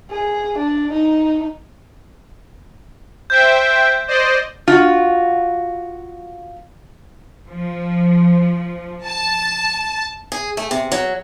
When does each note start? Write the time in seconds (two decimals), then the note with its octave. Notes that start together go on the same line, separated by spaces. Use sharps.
0.11 G#4
0.58 D4
0.93 D#4
3.30 C5 E5 G5 G6
4.07 C5 D5 D#5
4.68 F4 F#4
7.49 F3
9.05 A5
10.32 G#4
10.57 A3
10.71 C3
10.92 F#3